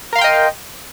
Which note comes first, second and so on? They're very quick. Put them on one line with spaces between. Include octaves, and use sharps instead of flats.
A#4 F5 C6 G5 D#5